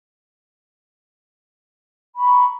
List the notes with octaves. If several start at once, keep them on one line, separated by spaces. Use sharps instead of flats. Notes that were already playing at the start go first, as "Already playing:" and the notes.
A#5 B5 C#6